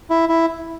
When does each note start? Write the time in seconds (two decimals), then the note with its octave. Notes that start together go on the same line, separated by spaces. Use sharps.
0.10 E4
0.29 E4